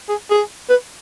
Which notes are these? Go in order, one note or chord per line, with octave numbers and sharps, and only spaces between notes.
G#4
G#4
B4